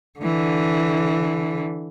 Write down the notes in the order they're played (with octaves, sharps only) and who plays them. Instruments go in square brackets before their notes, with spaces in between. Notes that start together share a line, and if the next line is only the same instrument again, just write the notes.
[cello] D3 E3